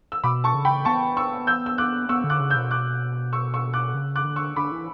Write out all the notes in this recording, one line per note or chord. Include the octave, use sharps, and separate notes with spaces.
E6
B2 B5 D6
A5 C#6
C#3
G5 B5
B3 A5 C#6
C#6 E6
E6 G6
E6
D6 F#6
B3 C#6 E6
D3
D6 F#6
C#3
E6 G6
B2
D6 F#6
C#6 E6
C#6 E6
D6 F#6
C#3
D6 F#6
D3
C#6 E6
D3 B5 D6
E3